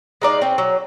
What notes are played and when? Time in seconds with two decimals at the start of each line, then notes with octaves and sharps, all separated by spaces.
0.22 G#3 D#4 D5 F5
0.41 C4 C#4
0.58 F#3